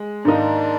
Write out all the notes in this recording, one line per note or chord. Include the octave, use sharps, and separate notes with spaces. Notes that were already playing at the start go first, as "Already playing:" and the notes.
Already playing: G#3
G#2 D#3 A#3 D4 D#4